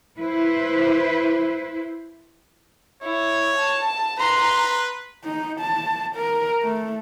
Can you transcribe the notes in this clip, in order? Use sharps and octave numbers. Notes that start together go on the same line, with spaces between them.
E4 B4 C5
E4 C#5
A5
B4 A#5 C6
D#4
A5
A#4
A3